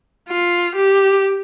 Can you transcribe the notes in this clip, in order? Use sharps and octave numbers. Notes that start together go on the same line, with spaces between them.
F4
G4